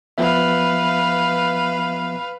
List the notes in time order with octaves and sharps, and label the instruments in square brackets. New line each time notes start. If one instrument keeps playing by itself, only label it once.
[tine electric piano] F3 B3 E5 [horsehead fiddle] B4 F5